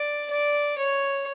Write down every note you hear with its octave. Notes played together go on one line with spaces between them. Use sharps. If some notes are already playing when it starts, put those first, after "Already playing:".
Already playing: D5
D5
C#5